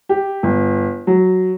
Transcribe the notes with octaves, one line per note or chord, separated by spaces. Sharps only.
G4
G1
F#3